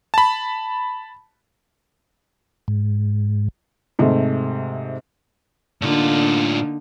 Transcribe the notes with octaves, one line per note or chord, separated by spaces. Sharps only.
A5 B5
G#2
G#2 C3 A3
A2 D3 A#3 D#4 F4